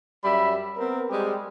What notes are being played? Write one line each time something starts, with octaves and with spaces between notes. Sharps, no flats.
F#2 G3 E5 B5
B3 C4 A#4
G3 G#3 C4 G4